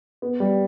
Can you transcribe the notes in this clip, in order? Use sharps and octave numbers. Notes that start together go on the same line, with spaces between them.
B3
G3